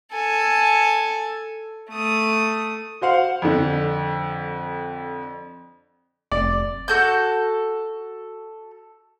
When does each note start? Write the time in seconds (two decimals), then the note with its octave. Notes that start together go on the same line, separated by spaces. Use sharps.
0.13 A4 G#5
1.90 A3 D#6
3.02 F#4 C5 F5 F#5
3.42 F2 D3
6.32 F1 D5
6.88 F#4 A4 G6